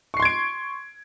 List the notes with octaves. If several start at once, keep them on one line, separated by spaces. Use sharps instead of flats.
C6 C#6 G#6 C7 D7